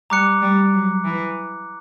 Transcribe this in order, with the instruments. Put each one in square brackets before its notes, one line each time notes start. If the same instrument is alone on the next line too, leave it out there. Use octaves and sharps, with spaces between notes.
[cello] G3 [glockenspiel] A#5 D6 F#6 C#7
[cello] G3
F#3
E3